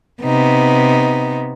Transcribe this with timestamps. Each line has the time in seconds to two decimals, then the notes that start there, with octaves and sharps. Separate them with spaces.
0.22 C3 B3 D#4